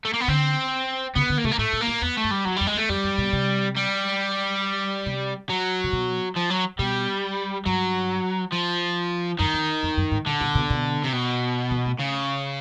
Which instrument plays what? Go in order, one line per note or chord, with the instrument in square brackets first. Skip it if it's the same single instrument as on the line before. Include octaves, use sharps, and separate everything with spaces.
[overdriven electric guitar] A3
A#3
B3
[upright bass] D3 [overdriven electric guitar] C4
[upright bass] C#3 [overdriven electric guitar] B3
[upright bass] D3
[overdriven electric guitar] A#3
[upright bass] C3 [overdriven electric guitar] A3
[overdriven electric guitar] A#3
[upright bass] A2 [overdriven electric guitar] A3
[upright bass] A#2
[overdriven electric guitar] A#3
[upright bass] A2
[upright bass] E2 [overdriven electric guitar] B3
[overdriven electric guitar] A3
[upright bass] G2
[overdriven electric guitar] G3
[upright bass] F#2 [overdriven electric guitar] F#3
[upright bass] F2 [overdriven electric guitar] G3
[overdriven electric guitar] G#3
[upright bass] E2
[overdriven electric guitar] A3
[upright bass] F2 [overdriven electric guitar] G3
[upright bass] F#2
B2
C3
[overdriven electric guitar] G3
[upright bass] C3
[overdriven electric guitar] F#3
[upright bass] C3
B2
[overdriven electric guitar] F3
F#3
[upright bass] B2 [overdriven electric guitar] G3
[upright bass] G2 [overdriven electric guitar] F#3
[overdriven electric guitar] F3
[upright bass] F#2 [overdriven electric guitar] D#3
[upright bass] F2
F2
F#2
G#2
[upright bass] A#2 [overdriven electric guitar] D3
[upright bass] A#2
B2
B2
[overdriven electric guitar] C3
B2
[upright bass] E3
A3
[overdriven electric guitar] C#3